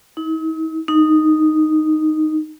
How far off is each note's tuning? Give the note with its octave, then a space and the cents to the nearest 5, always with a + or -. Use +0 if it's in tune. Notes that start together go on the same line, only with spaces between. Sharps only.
D#4 +45
D#4 -5